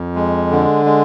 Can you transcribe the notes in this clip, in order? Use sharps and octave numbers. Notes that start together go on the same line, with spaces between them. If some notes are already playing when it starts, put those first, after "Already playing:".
Already playing: F2
G#3
D3
G#3